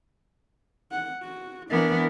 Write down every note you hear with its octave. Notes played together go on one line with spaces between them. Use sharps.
F#5
F#4
E3 B3 D4 A#4